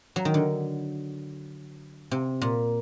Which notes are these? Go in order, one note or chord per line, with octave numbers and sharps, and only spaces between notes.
F#3
D#3
D3
C3
A#2